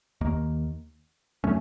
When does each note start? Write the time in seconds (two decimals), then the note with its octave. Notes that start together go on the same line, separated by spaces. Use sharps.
0.21 D#2 D#3 A#3
1.44 A2 F#3 A3 C#4